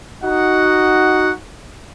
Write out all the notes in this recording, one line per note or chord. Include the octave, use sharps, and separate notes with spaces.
D#4 F#4 F#5